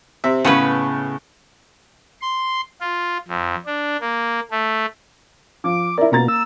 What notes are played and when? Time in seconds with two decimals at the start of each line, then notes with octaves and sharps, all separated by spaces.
0.24 C3 C4 E5
0.45 A2 C#3 B3 C#4 B4
2.21 C6
2.81 F4
3.28 F2
3.66 D4
4.01 A#3
4.51 A3
5.64 F3 D6
5.98 E4 A#4 D5
6.12 B2 A#3 A#5 A6
6.28 E6